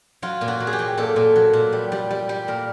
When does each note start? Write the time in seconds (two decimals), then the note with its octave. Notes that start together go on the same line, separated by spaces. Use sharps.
0.22 F#3 F4
0.41 A#2
0.48 F#4
0.60 F#3
0.67 G#4
0.73 G4
0.79 F#3
0.98 A#2 A4
1.16 A#2
1.36 F#3
1.53 A#2
1.73 G3
1.92 G3
2.11 G3
2.29 G3
2.48 A#2 A#4